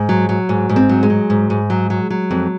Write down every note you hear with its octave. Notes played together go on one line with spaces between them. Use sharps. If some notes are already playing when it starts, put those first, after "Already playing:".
Already playing: G#2
F#3
F#3
G#2
G#2
C4
F#3
G#3
F#3
G#2
G#2
F#3
F#3
F#3
F2